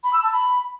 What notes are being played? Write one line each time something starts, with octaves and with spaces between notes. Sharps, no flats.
B5
E6
A5
B5